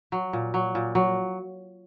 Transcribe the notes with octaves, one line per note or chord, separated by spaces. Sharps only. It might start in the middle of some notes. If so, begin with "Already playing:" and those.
F#3
A#2
F#3
A#2
F#3